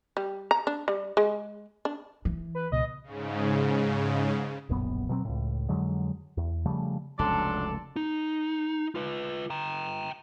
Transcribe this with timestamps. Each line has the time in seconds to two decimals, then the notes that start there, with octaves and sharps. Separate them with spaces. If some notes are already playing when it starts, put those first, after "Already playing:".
0.17 G3
0.51 A#5
0.67 D4
0.88 G3
1.17 G#3
1.85 D4
2.25 E3
2.55 B4
2.72 C#2 B2 D#5
3.04 G#2 C#3
4.69 D1 A#1 F#2 B3
5.09 B2 F#3 G#3 C4
5.25 C#2 A2
5.69 F2 D3 F#3 G#3
6.37 E2
6.66 C#3 F3 G3 A3
7.19 F1 C#2 F#3 D4 A4 D5 C6
7.96 D#4
8.95 F4 B4
9.50 G5 A#5